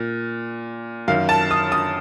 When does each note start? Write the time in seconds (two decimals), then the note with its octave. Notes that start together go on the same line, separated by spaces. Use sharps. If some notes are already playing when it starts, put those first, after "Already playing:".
Already playing: A#2
1.08 F#2 D#3 F5
1.29 A5
1.51 D#6
1.72 D#6